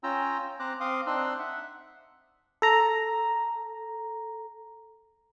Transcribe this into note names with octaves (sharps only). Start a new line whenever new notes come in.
C#4 F4 G5 A#5 E6
C4 C5 A#5 D6 F#6
C4 F5 C6 D6 D#6
C4 D4 D#4 C6 E6 F#6
E5 F#5
A4 A#5